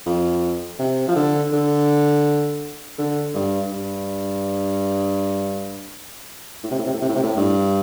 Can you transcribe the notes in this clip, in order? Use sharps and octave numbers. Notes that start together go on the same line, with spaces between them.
F2
C3
F3
D3
D3
D3
G2
G2
A2
C3
A2
C3
A2
C3
A2
C3
A2
G2